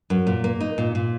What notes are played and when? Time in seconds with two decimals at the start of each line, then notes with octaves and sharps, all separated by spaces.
0.10 F#2
0.27 A#2
0.44 A#3
0.60 D#4
0.78 A#2
0.95 A#2